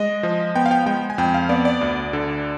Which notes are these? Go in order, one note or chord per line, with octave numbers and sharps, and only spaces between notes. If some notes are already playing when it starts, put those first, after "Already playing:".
Already playing: G#3 D#5
F3
B3 G5
F5
G5
G#3 G5
G#5
F2 G5
F5
B3 D5
D5
D2
D3